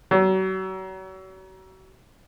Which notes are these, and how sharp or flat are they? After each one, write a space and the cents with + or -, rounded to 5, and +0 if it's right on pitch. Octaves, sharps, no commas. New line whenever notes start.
F#3 +35